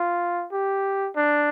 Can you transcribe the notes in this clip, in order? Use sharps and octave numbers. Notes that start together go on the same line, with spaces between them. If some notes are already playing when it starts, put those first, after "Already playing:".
Already playing: F4
G4
D4